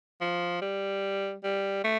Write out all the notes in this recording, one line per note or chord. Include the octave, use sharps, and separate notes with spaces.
F3
G3
G3
A3